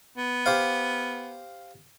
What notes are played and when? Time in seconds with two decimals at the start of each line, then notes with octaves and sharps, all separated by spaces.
0.17 B3
0.46 G4 C5 F5